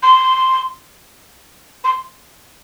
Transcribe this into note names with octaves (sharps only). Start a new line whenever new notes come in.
C6
C6